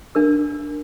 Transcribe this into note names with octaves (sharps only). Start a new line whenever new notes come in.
D4 A#4 E6